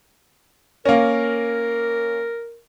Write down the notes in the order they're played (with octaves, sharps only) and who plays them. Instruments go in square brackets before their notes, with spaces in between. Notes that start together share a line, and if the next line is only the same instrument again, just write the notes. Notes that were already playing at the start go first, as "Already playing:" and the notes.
[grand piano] A#3 C#4 [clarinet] A#4